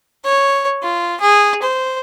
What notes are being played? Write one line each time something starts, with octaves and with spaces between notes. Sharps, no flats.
C#5
F4
G#4
C5